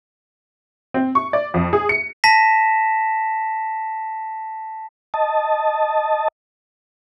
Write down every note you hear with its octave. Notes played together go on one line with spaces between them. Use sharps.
C4
C#6
D5
F2
G#4
C#7
A5 A#6 B6 E7
D#5 A5